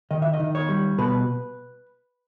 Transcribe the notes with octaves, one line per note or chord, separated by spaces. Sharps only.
D#3 D#5
E5
D#5
D#3
C#5
G3
B2 B4